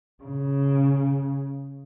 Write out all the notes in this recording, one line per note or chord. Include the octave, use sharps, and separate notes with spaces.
C#3